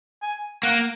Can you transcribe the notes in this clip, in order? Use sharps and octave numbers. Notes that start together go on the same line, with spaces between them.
G#5
A#3 F#5